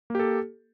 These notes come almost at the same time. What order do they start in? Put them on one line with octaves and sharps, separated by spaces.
A#3 G4 A4